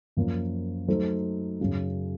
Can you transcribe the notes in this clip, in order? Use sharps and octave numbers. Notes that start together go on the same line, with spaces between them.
F#2 F3 A#3
F#3 A3 D#4 A4 C5
F#2 C#3 F#3